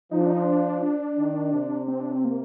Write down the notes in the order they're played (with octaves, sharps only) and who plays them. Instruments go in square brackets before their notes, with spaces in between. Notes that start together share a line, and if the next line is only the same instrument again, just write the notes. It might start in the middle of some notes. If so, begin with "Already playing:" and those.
[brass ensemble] F3 [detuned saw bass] D#4
[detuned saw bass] D4
D#4
D4
D4
[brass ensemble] D#3
C3
[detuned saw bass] C4
D4
C4
A#3